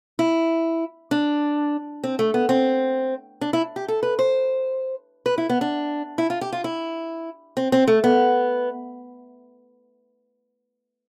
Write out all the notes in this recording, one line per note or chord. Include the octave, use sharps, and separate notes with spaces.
E4
D4
C4
A3
B3
C4
D4
E4
G4
A4
B4
C5
B4
E4
B3
D4
E4
F4
G4
F4
E4
C4
C4
A3
B3